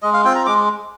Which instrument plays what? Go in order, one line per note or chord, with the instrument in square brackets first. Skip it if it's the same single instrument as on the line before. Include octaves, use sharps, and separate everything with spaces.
[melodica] G#3 D#5
F5
C4 F4 G5
A#5
G#3 D6